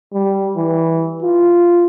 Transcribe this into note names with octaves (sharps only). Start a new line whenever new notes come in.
G3
E3
F4